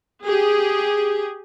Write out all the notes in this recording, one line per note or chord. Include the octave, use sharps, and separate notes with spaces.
G4 G#4